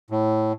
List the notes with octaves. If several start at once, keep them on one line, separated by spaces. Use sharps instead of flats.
A2